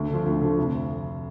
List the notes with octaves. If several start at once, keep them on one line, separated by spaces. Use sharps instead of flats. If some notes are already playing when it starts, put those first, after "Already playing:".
Already playing: D2
D3 F3
D2
D3 F3
F1